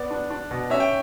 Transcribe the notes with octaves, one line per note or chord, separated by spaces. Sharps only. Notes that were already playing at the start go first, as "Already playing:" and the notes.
Already playing: B3 D5
D4
D4
B2
C#4 E5
G5